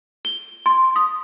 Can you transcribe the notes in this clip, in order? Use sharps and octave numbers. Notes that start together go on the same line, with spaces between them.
G7
C6
D#6